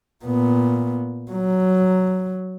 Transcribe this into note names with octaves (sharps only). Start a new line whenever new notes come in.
A#2 B3
F#3